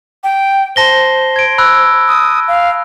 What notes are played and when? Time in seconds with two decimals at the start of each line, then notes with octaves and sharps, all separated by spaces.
0.24 G5
0.76 C5 A5 A#6 G7
1.36 G#6 D7
1.58 B5 E6 F#6
2.08 D#6
2.48 F5